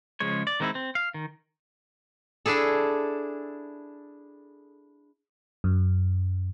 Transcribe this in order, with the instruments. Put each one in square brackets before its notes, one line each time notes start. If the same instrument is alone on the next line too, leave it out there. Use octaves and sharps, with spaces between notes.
[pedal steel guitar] C#3 F3 G#3 C#5
D5
D#3 G#3 C4 D#4 E4
C4
F5
D#3
[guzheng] D4 E4 G#4 A4
[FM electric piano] F#2